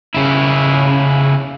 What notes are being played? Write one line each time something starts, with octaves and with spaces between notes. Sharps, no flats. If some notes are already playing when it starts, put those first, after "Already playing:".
C#3 E4